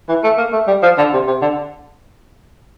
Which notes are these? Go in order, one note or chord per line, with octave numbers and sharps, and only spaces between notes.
E3
A3
A#3
A3
G3
F3
D3
C3
C3
D3